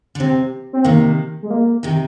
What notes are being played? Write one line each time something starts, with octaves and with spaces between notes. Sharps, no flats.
D3
C3 C4
C4
C3 D#3 A#3
G#3
A#3
C3 D#3